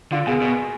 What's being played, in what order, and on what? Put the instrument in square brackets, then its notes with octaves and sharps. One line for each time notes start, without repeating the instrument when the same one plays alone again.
[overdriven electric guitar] D3 [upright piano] F4
[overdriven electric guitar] B2 [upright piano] G#4
[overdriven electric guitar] B2